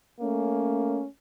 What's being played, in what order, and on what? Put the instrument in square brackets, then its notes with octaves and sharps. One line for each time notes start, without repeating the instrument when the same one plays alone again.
[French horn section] A3 A#3 C#4